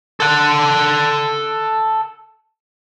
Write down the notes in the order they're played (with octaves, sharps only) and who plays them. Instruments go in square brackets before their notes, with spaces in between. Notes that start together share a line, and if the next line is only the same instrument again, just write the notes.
[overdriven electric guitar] A4 F#5